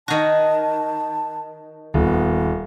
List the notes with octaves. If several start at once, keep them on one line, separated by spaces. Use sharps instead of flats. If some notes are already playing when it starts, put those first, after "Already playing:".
D#3 F#4 A5
D#1 B3